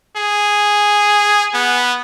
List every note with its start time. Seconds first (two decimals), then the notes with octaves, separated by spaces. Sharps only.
0.17 G#4
1.54 B3